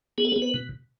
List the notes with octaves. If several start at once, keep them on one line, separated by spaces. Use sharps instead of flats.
B3 G#4
A4
G#4
B3
B4
B2